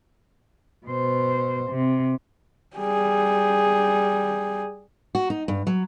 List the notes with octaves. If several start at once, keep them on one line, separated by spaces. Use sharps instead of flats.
B2 C5
C3
G3 G#4
F#4
D#4
G2
F#3